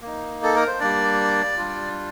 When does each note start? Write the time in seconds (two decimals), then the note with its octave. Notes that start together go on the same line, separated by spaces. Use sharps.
0.02 A#3 D#4
0.43 A4
0.56 A#4
0.67 C5
0.80 G3 A#3 D4 D5
1.57 G3 D4 F4